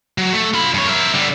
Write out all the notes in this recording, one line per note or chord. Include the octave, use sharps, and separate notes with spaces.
F#3
A3
F4 B5
G2 C#5
A#4 E5
D3 G3